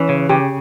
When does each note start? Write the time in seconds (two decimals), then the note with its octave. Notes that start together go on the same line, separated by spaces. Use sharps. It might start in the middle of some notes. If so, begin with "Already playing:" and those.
Already playing: E3 C#4
0.09 C#3
0.29 C#3 G4